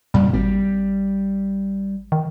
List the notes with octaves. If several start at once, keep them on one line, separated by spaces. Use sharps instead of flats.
F2 A#2 C#3 G3
G#1 G3
D#3